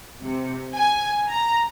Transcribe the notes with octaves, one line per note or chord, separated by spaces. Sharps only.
C3
G#5
A#5